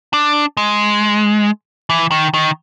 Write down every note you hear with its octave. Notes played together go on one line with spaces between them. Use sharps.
D4
G#3
E3
D#3
D#3